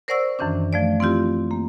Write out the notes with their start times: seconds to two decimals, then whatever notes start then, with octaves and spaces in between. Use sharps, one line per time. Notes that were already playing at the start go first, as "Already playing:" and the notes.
0.08 A#4 C5 D5 F#5 C#6 E6
0.39 F#2 D#3 E3 C#4 D4
0.73 F3 A3 D5
1.00 C4 E4 F4 G4
1.51 A#3